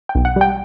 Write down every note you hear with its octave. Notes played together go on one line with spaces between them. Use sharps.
G5
B1
F#5
G3 G5